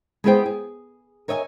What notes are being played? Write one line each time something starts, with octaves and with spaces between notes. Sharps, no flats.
G#3 B3 E4 G#4 C5 G5
G#4
A#4 C#5 D#5 E5 G5 G#5